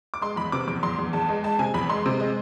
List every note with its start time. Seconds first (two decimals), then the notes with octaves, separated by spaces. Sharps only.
0.14 D6
0.21 G#3 C6
0.36 E2 B5
0.52 C3 D6
0.67 E2 D6
0.83 E2 C6
0.99 E2
1.13 E2 A5
1.29 G#3
1.44 G#3 A5
1.59 C3 G#5
1.74 E2 B5
1.89 G#3 C6
2.06 C3
2.20 G#3